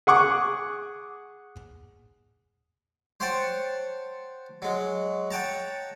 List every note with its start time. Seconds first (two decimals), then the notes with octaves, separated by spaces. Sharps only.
0.07 G#4 F#5 C#6 D6
3.20 C5 C#5 F#5 G5 A5
4.62 F#3 G#3
5.31 C#5 F#5 G5 A5 A#5